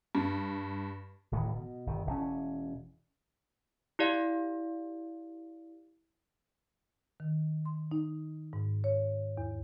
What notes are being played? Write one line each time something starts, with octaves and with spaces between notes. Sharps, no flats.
G2
D1 A2 D#3 E3
B2
G1 D#3
E1 A#2 C#4
E4 G4 D5 F5
D#3
C6
D#4
G#2
C#5
E2